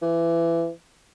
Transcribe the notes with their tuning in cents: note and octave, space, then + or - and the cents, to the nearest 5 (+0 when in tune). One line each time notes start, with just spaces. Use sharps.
E3 +25